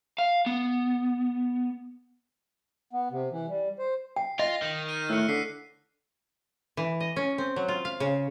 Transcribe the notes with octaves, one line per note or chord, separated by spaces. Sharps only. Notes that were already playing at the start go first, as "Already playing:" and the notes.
F5
B3
B3
C3
E3
G3
C5
G5 C7
F4 D#5 A#6
D#3
F6 D#7
A2 E6 F#6 C#7
D3 B6 C7
E3
D#5
C#4
C4
F#3
F4
F5
C#3